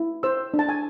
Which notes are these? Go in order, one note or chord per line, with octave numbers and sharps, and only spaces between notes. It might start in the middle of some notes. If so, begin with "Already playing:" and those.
Already playing: E4
C5 E6
D4
A5
G#5